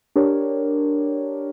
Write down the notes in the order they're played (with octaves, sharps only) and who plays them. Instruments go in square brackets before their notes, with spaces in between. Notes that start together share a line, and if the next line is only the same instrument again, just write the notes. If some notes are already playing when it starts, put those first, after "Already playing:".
[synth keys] D4 G4 A#4 C#5